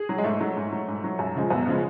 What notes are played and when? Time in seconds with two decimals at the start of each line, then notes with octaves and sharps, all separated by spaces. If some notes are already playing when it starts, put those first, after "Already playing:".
Already playing: G#4
0.09 F#3
0.18 G#3
0.24 G#2 A3
0.40 F#3
0.57 G#2
0.72 F#3
0.88 G#2
1.04 F#3
1.19 F#2
1.35 C#3 F3 G#3
1.50 F#2 B3
1.66 C#3 F3 G#3